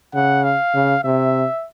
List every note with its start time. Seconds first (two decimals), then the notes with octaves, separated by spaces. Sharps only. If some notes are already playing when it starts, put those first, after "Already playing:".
0.14 C#3 F#5
0.44 F5
0.74 C#3
1.04 C3 E5